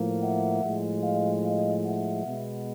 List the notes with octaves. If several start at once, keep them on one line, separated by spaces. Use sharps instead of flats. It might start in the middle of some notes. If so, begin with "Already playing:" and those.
Already playing: A2 F3 A#3
E5 F#5
A2 F3 G#3
D#5 F5
D#5 F5
E5 F#5
B2 G#3 B3